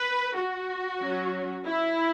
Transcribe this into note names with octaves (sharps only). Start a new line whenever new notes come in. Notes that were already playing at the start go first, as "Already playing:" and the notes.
Already playing: B4
F#4
F#3 C#4
E4